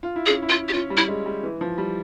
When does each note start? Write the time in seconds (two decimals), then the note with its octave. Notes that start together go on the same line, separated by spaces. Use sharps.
0.03 F4
0.16 E4
0.26 G#4
0.29 C#4
0.42 E4
0.49 F4
0.68 G4
0.73 C#4 F4
0.90 G3
0.97 E4
1.08 G#3
1.26 G3
1.43 E3
1.61 F3
1.78 G3